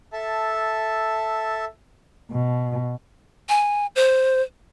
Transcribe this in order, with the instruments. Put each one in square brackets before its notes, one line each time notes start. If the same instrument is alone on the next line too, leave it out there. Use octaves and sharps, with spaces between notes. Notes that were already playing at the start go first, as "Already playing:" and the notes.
[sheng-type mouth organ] A4 E5 A5
[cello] B2
[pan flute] G#5
C5